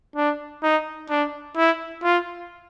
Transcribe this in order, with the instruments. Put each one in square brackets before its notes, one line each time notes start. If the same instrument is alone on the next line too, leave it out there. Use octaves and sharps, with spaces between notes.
[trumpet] D4
D#4
D4
E4
F4